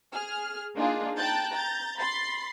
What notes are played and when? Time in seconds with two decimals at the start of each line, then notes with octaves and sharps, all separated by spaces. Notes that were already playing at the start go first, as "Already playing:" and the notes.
0.13 G#4 F6
0.74 A#3 D4 D#4 F4 G#4
1.17 G5 A5 A#5 F#6 G6 A6
1.50 A#5 G6 A6
1.99 B5 C6 A6 C7